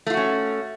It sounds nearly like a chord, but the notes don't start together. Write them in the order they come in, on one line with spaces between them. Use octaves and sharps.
A3 F4 F#4 C#4